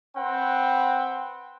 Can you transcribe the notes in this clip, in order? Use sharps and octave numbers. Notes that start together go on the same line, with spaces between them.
C4 B4 F#5 G5